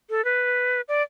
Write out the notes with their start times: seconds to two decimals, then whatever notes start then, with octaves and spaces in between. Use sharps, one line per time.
0.10 A4
0.25 B4
0.88 D5